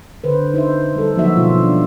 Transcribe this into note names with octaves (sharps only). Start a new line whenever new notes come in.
D3 B4 C5
D#4 C5 E5
G3 A4
F3 F#3 A#3 D#4 F#4 E5
B2 F4
D4 D5